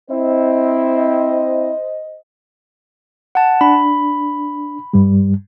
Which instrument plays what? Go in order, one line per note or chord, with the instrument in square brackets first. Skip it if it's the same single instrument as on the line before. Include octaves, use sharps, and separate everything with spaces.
[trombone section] C4 E4 [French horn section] C5 D#5
[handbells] F#5 A5
[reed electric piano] D4 [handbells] B5
[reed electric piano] G2 G3